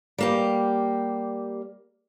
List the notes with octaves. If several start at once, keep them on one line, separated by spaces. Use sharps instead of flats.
G3 A#3 G4